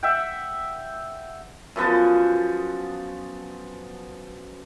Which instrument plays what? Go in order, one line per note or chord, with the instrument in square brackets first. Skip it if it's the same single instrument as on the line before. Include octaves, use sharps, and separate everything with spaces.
[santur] E5 F#5 G5
[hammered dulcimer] F#2 F3 B3 A5